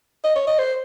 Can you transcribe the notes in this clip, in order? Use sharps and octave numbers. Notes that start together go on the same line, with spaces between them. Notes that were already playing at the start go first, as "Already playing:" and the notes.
D#5
C#5
D#5
C5